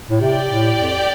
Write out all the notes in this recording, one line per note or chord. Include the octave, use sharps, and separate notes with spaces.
A2
C3 G4 D5 G5
A2
F2